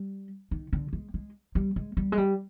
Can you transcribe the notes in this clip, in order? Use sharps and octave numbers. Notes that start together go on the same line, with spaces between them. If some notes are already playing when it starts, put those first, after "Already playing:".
Already playing: G3
D#3
D3
G#3
G#3
G3
G#3
G3
G#3
G3